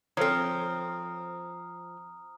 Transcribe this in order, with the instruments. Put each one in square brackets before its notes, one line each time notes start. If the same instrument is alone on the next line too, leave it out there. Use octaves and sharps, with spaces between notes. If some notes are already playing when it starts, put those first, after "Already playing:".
[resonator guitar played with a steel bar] F3 C4 [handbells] A4 C5 C#5 [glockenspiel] A#5 D#6 F6